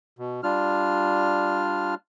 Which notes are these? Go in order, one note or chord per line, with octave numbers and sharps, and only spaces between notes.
B2
G3 D4 F4 F6